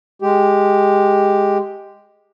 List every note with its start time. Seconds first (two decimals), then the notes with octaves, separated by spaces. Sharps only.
0.22 G#3 G4